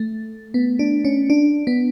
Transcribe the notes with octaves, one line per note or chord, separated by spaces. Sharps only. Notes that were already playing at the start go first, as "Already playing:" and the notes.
Already playing: A3
B3
D4
C#4
D4
B3